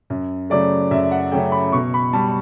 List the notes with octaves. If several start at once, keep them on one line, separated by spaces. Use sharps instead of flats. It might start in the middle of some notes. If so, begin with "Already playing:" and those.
F#2
C#3 F#3 A3 D5
F#2 E5
F#5
C#3 F#3 A3 G5
B5
B2 C#6
B5
G3 A5